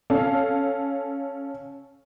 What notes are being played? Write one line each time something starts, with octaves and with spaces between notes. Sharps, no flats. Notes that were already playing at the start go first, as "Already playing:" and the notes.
C#4 A4 F5